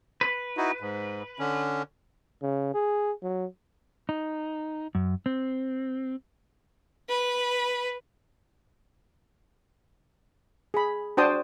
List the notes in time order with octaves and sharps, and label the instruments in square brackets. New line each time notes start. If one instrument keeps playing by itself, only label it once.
[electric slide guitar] B4
[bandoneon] D#4 E4 F#4
G#2
D3 C#4
[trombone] C#3
G#4
F#3
[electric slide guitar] D#4
F#2
C4
[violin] B4
[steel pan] G#4 B5
D4 F#4 C5 G5 A5 D#6